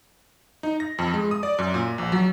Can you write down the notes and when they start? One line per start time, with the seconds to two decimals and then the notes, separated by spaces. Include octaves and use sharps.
0.63 D#4
0.80 A#6
0.98 F2
1.14 G#3
1.31 D#6
1.43 D5
1.59 F#2
1.74 A#2
1.98 A#1
2.12 F#3